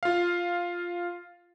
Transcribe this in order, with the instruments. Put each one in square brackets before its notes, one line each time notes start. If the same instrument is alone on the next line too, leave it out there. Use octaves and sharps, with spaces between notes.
[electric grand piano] F4 F5